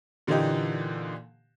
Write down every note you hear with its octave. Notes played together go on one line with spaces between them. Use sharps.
A#2 D3 E3 A#3 D#4 G4